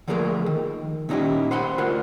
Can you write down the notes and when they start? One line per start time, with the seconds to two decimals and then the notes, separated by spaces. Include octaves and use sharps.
0.08 D3 F3 A3 A#3 G#4 A#4
0.46 D#3
1.09 A#2 C#4 D#4 E4 G4
1.51 C5 F#5 B5 C6
1.78 D2 F4 A#4 C5 F#5